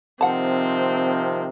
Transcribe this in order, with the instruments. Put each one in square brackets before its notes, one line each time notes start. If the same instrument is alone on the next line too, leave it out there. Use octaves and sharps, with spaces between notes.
[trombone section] C3 D#3 F3 [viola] C4 [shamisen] F#5 A5